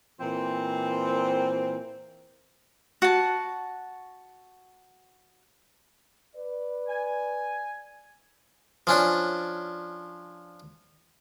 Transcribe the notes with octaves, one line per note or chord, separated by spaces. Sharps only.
A#2 E3 C4
F#4 A5
B4 D5
G#5
F3 C#4 D4